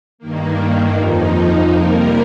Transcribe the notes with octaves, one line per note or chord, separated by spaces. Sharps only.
G2 D#3 A#3
F2 F3 D#4
C3 G3 A#3 A#4